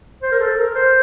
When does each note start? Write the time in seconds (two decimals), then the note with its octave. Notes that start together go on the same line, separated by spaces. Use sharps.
0.22 C5
0.32 A#4
0.40 A4
0.57 A#4
0.74 C5